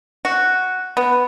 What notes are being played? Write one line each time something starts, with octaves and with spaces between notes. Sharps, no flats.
F#4
B3